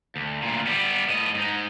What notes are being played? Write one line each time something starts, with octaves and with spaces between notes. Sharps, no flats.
D2
D2 A#2
G3 B3
A2 D#5
G#2 D#4